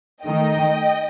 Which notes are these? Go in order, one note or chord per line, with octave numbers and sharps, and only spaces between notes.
D#3 A3 D#4 D#5 G5